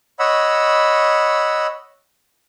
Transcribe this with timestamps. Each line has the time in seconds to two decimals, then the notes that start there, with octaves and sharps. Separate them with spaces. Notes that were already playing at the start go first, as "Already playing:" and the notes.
0.19 C#5 D#5 F#5 B5 E6